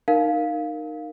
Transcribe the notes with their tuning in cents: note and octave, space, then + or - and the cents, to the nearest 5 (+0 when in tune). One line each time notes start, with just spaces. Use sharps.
D#4 -20 A#4 +0 F5 +0